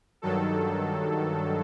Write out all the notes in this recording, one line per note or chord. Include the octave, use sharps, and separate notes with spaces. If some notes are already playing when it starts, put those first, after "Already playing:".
G2 D#3 F#3 A4